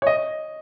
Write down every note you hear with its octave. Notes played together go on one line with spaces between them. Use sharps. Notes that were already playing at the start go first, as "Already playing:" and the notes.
C#5
D#5